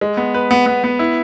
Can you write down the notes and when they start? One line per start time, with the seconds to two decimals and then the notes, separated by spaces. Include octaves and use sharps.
0.01 G#3
0.17 B3
0.34 B4
0.51 B3
0.66 B3
0.84 B3
0.99 E4